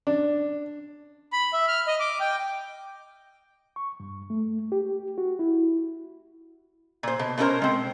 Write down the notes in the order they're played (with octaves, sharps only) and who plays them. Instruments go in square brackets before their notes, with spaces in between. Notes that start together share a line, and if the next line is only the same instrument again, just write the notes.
[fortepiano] D4
[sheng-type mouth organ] B5
E5
F6
D#5
D6
G5
[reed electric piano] C#6
G2
A3
G4
F#4
E4
[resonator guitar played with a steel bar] A#2 C5
B2
B2 A3 C#4 F4 A#4 C5
G#3 C4